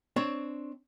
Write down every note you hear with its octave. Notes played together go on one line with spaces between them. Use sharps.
C4 D4 C#5